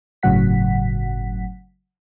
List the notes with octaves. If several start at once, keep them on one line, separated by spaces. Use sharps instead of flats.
G1 A2 C#3 F#3 F#5 B6